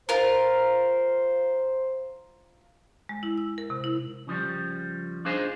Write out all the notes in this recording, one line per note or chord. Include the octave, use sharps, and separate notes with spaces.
F4 A#4 C5
G#3
E4
E6
A#4
C3
E4
C#3 F3 G3
D4 D#4 F4 G#4 C5